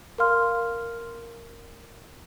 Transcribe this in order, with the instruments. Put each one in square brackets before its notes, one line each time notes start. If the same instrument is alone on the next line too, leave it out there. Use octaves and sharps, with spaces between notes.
[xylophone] A#4 F5 C6 F6